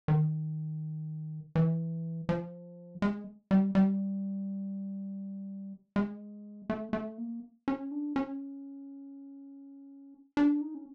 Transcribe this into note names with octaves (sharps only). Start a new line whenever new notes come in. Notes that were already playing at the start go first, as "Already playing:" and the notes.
D#3
E3
F3
G#3
G3
G3
G#3
A3
A3
A#3
C#4
D4
C#4
D4
D#4
C#4